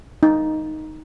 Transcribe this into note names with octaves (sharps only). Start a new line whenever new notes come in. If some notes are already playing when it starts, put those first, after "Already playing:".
D#4